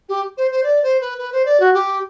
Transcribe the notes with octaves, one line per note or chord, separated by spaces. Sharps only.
G4
C5
C5
D5
C5
B4
B4
C5
D5
F#4
G4